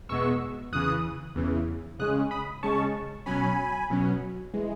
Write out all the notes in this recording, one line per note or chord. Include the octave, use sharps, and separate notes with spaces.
E2 B2 G#3 B3 C#6 E6
E2 C#3 E3 D#6 F#6
E2 C#3 E3
C#3 G#3 C#4 D#6 F#6
B5 D#6
C#3 G#3 C#4 A5 C#6
B2 F#3 C#4 G#5 B5
B2 F#3 C#4
E3 G#3